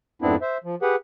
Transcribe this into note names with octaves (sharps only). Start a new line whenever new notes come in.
F2 G#2 B3 C4 D4 E4
C5 E5
F3
G4 G#4 B4 F#5